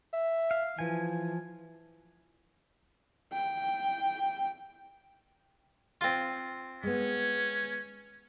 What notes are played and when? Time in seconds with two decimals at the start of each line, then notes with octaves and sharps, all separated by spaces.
0.13 E5
0.51 F5
0.79 E3 F3 G#5
3.33 G5
6.01 C4 F4
6.83 G#3 B3 C#4